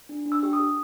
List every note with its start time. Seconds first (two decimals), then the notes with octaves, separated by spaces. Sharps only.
0.09 D4
0.26 D4
0.32 E6
0.43 G4
0.53 D#6
0.60 G4